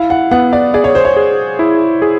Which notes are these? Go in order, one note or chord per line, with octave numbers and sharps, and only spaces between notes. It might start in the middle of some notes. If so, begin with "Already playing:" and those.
Already playing: E4 F5
F#5
B3 F#5
D5
G#4 D5
C#5
C5
C#5
G#4
E4
G#4